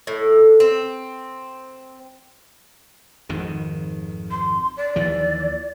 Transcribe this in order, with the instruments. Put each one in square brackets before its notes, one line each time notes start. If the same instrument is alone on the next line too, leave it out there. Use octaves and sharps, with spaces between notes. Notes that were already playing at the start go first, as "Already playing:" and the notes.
[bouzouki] A2
C4
[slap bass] G#1 F2 D#3
[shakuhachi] C6
D5
[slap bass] D#2 E3 F3